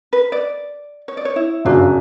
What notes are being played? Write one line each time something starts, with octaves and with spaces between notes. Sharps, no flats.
B4
D5
C#5
D5
C#5
E4
G1 F#2 C#3 F#3 D4